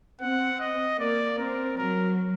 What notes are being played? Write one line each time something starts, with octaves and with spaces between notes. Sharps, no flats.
C4 F#5
D#5
A#3 D5
C4 A#4
F#3 A#4